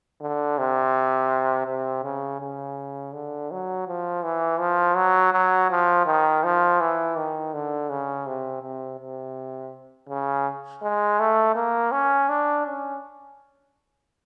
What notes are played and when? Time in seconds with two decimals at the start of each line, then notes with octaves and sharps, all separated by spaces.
0.21 D3
0.58 C3
1.67 C3
2.04 C#3
2.41 C#3
3.14 D3
3.51 F#3
3.88 F3
4.24 E3
4.60 F3
4.96 F#3
5.33 F#3
5.71 F3
6.06 D#3
6.44 F3
6.80 E3
7.16 D#3
7.54 D3
7.90 C#3
8.27 C3
8.62 C3
8.99 C3
10.09 C#3
10.82 G#3
11.19 A3
11.55 A#3
11.92 C#4
12.29 D4
12.66 C#4